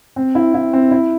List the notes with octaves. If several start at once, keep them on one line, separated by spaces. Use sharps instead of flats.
C4
E4
E4
C4
E4